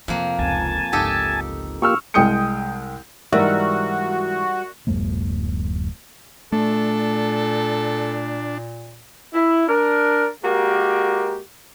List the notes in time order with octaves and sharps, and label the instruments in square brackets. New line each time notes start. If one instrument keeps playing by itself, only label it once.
[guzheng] F2 A#3 [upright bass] C3
[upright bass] F1 C#2 [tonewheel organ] G#5 A5
[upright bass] G1 C#2 [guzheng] D#4 G4 A4
[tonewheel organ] A#3 F4 G4 [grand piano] C#6 E6 F6
[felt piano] C2 G#3 G5 D#6 G6 C#7
[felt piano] G#2 E3 [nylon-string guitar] G3 [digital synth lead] F#4 [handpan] A#4 E5
[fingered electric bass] D1 F#2 G#3 A#3
[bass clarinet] A#2 [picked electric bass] A3 [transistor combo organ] D4 [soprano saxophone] A4
[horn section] E4
D4 A#4
G#3 A#3 F#4 G4 A#4